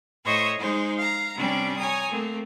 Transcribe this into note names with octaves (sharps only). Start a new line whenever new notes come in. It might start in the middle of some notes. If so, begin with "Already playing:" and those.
A2 C5 C#5 D#5 E5 C#6
G#3 D#4 C5
F5 A#5
C3 G3 C#4 D4 D5
C#5 G#5 A#5 D#6
A3 A#3 C4